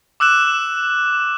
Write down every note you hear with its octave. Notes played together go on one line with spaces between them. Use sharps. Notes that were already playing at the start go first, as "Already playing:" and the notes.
D6 E6 F#6 E7